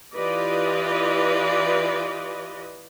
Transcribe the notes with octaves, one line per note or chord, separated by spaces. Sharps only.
E3 F4 G4 B4 D5 D#5